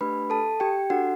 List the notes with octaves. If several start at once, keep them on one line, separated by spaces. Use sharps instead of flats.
A3 D4 G4 B4 B5
A4 A5
G4 G5
D4 F#4 A4 F#5